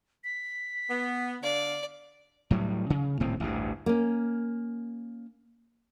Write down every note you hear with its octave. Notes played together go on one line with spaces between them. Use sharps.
B6
B3
D3 D5 F5
A2 F#3 G3
C#3
D#1 D2 A2 C4
A1 D2 G2
A#3 C#4